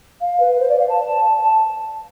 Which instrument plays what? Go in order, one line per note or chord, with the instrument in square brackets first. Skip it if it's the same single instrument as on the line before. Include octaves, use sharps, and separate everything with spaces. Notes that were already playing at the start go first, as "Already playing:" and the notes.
[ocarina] F5
B4
C5
D5
F5
A5
A5